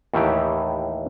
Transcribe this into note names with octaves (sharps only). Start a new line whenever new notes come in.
D#2 A2 D#3 E3 G4